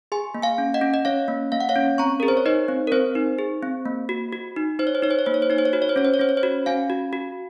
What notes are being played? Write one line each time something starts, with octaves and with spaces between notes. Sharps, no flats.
G#4 G#5 C6
A#3
F5 G#5
C#4
D#5 F#5
C#4
D#5
C#4 C#5 F5
A#3
A#3 F5
F#5
C#5 F5
C#4
C4 A#5 C#6
G#4 A#4
C5
C#5
D#4 C5 D#5
C4
A#4
C4 C5
D#4
G#4
C4
A#3
F#4
F#4
D#4
D#4 C5
C#5
C5
D#4 C#5
C5
C#5
A#3 C5
C#5
C5
D#4 C#5
C5
C#5
F#4 C5
C#5
C5
C#4 C#5
C5
C#5
C#4 C5
C#5
C5
F#4
C#4 F5 G#5
F#4
F#4